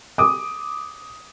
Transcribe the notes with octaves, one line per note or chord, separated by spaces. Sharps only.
D6 D#6